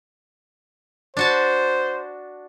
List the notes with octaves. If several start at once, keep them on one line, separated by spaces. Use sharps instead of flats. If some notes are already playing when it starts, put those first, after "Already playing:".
D4 F#4 C5 A5